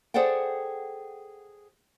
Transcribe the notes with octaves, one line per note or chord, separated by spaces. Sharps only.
G#4 A4 C5 D5 F#5 G5